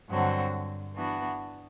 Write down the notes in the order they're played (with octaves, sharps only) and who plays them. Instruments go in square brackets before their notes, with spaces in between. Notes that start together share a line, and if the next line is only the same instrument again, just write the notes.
[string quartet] G2 D3 F#3 C4 F#4
E3 B3 D4 F#4